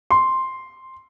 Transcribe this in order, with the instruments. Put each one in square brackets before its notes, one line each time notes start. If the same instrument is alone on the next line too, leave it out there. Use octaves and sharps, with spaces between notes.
[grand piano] C6